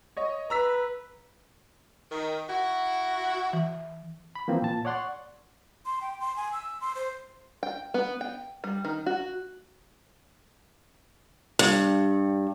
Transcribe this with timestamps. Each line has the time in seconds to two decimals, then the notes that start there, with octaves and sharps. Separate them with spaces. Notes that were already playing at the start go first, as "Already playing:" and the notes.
0.17 C#5 D#5
0.50 B4 A#5 E6 B6
2.11 D#3
2.49 E4 F#4
3.53 E3
4.35 B5
4.48 E3 F3 A#3 C4
4.62 A#2 A5
4.85 C#5 D5 F#5 C6 C#6
5.86 C6
6.01 G5
6.21 C6
6.36 G#5
6.53 E6
6.81 C6
6.95 C5
7.63 G5
7.94 B3
8.21 G5
8.64 G3
8.85 D#3
9.06 F#4
11.59 G2